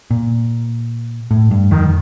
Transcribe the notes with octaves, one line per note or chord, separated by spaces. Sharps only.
A#2
A2
G2
F2 D#3